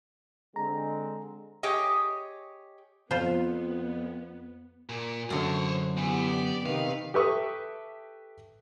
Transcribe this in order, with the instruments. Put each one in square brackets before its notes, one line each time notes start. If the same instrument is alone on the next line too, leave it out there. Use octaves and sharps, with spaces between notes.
[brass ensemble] D3 G#3 C4 [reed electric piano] A#5
[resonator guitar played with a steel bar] G4 G#4 C#5 D#5
[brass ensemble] F2 [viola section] B3 [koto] F4 C5
[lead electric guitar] A#2
[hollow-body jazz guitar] F#2 D3 [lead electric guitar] C5 C#5
[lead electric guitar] E2 E3 [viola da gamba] B3 G4
[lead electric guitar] D5
[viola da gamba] C3 D#3 B4 [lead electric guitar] F5
[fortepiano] G4 A4 B4 E5 C#6 D#6